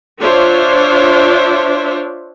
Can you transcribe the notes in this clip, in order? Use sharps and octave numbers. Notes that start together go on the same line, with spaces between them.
D4 F4 C5 C#5 E5